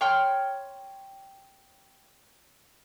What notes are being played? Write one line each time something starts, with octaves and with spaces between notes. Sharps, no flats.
C#5 G5 C6 F6